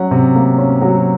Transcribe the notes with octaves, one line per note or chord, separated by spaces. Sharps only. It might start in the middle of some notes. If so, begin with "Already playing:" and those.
Already playing: F#3 C#4 F#5
C3
A#3
C#4
F#3